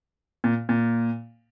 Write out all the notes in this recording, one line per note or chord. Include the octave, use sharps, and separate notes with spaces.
A#2
A#2